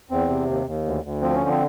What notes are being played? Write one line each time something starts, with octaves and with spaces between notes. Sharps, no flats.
E2 C4
C3
D#2
D#2
D2
D2
F3 C4
C#4
D3
C4